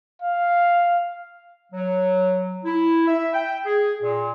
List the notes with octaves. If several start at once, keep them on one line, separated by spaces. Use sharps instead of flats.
F5
F#3
E4
E5
G5
G#4
A#2